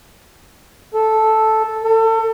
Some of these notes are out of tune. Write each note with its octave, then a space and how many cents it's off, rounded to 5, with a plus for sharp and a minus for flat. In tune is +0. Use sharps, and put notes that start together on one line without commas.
A4 -5
A4 +30